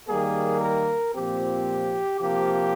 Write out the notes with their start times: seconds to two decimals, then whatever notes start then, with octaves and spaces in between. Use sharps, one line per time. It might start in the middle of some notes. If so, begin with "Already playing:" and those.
0.08 D#3 G3 A#3 G#4
0.61 A#4
1.14 A#2 F3 C4 G4
2.20 C3 F3 A#3 G4